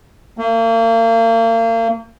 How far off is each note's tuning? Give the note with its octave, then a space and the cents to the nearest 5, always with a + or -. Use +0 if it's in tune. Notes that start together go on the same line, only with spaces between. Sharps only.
A#3 -40